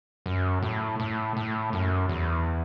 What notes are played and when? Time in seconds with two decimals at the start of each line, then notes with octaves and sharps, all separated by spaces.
0.26 F#2
0.62 A2
1.00 A2
1.37 A2
1.73 F#2
2.09 E2